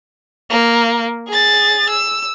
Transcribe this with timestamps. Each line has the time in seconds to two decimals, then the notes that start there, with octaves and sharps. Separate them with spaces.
0.50 A#3
1.29 G#4 A6
1.90 E6